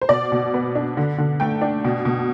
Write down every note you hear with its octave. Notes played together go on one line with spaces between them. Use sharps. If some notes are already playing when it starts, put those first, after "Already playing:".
C5
B2 D5
B2
B3
D4
D3
D3
A3 G5
D4
B2
B2